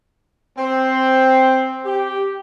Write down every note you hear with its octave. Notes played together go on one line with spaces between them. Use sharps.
C4
G4